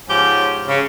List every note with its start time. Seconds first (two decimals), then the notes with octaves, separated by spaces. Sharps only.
0.09 G#2 F3 C#4 G4
0.68 C#3